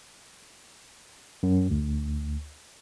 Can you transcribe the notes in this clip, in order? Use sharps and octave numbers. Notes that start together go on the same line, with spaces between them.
F#2
D2